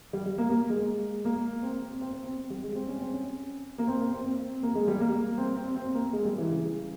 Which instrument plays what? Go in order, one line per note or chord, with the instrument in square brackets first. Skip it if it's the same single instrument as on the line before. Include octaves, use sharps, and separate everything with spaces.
[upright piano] G3
G3
A#3
A#3
G#3
A#3
C4
C4
C4
C4
C4
G3
G#3
C4
C#4
C4
C#4
A#3
C4
A#3
C4
C4
A#3
G#3
G3
A#3
C4
C4
C4
A#3
G#3
G3
E3
C#3